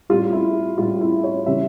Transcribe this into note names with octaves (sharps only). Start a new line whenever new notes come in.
A2 G3 F4
E4
A2 G3 F4
E4
C#5
C#3 E3 G3 E5